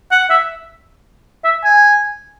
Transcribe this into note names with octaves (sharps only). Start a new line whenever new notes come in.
F#5
E5
E5
G#5